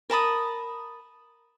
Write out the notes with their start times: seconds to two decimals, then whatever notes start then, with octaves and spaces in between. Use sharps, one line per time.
0.10 A#4 A5 B5 D#6